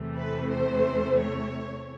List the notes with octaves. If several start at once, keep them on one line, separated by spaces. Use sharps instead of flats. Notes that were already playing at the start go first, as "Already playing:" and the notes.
Already playing: E2 C3 E3 A3
B4
C5
C#5